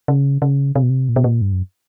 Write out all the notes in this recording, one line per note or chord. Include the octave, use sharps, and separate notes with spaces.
C#3
C#3
C3
B2
C3
A#2
B2
A#2
G2
F#2